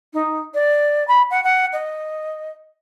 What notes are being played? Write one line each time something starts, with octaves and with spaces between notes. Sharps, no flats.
D#4
D5
B5
F#5
F#5
D#5